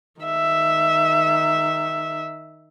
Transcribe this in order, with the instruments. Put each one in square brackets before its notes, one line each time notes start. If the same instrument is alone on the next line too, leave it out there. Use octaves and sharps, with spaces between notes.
[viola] D#3 E5